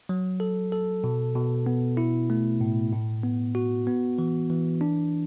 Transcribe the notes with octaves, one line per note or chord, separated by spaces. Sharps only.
F#3
A4
A4
B2
B2
B3
E4
A3
A2
A2
B3
F#4
B3
E3
E3
D4